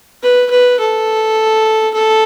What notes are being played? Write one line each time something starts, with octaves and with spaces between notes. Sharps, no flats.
B4
B4
A4
A4